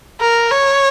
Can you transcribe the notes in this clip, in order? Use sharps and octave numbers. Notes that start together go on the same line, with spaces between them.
A#4
C#5